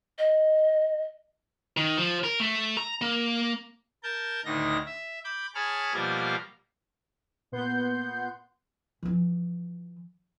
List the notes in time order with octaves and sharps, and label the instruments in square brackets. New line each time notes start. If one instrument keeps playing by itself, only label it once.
[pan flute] D#5
[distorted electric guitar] D#3
F3
A#4
A3
A#5
A#3
[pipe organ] A#4 A5 G6
D2 A2 D3 D#3 D#4 A#6
E5
B5 D6 G6
G#4 C#5 A5 B5 F6
B2 F3 G3 A#3 A#4 F5
[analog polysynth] A#2 B3 F#5 C6 G6
[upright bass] E3 F3